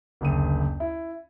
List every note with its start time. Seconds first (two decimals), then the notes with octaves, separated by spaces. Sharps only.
0.21 F#1 D2 D#7
0.80 E4